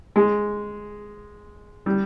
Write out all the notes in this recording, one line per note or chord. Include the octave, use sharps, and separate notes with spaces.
G#3
G3